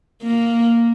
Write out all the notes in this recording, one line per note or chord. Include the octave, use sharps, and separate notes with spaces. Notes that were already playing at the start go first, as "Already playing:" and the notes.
A#3